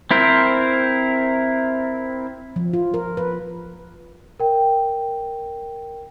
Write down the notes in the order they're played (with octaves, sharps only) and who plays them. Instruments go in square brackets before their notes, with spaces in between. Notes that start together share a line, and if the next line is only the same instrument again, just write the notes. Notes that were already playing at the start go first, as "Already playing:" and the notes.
[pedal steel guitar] C4 E4 A#4 C5
[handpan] F3
F4
A#4
B4
[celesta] A#4 G5